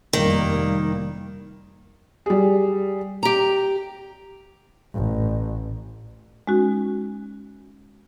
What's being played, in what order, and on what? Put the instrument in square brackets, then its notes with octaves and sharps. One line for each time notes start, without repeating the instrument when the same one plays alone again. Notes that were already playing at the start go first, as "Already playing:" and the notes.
[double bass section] F1 G3 A#3 [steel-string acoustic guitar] D#3
[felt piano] G3 G#4
[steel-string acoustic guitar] G4 A#5
[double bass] A1
[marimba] G#3 C#4 D#4 F#4